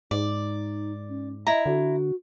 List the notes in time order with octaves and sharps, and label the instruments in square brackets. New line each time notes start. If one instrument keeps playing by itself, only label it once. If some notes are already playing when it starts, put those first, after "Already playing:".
[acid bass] G#2 [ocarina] D#4 [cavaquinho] D5
[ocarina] C#4
[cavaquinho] E4 A#5 [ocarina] D#5
[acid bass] D3 [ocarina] F#4